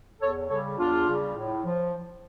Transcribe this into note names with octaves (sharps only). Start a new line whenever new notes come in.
E2 A4 C#5
C#3 G3 A4 C#5
E2 D4 F4
C#3 G3
A2
F3